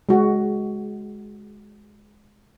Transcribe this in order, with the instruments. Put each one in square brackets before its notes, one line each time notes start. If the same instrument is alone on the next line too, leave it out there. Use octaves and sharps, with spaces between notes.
[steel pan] G#3 F#4